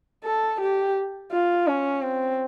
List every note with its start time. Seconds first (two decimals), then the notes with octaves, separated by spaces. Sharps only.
0.24 A4
0.61 G4
1.32 F4
1.68 C#4
2.03 C4